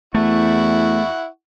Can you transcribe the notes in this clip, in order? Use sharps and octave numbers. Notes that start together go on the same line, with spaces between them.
E2 A3 E4 F#5 C#6